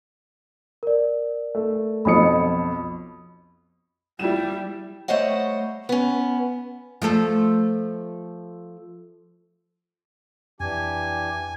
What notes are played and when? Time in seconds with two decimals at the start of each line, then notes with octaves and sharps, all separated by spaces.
0.83 A#4 D5
1.55 A3
2.05 B1 F2 B5 D#6 C#7
4.19 G3 E4 E7
5.08 G3 A3 C5 C#5 D#5 F#5
5.89 B3 C#4
7.02 F3 A3 A4
10.60 F2 E3 D4 G4 G#5